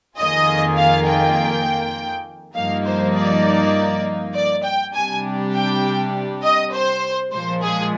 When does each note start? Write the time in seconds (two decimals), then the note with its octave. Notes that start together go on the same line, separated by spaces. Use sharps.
0.17 F2 D#3 A#3 F4 G#4 D#5
0.77 F5
1.07 G5
2.55 G2 F3 A#3 D#4 F5
2.85 C5
3.14 D5
4.34 D5
4.64 G5
4.94 C3 G3 D4 G4 G#5
5.54 G5
6.43 D#5
6.73 C5
7.32 A#2 F3 G#3 C5
7.62 G#4